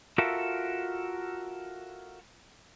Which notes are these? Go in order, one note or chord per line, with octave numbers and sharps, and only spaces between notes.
F4 F#4 A4 A#4 E5